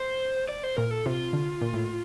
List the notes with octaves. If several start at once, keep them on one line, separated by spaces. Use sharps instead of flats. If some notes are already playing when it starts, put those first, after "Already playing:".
Already playing: C5
D5
C5
A#2 A#4
A4
C3 F4
D3
A#2
A2